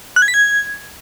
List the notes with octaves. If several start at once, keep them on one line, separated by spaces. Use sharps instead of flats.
F#6
G#6
B6
G#6